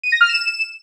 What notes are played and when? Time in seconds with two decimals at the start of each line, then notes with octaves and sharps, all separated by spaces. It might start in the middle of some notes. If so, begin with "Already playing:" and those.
0.03 D#7
0.12 A#6
0.21 F6
0.29 E7